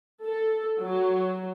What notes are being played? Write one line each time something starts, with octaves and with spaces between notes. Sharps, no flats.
A4
F#3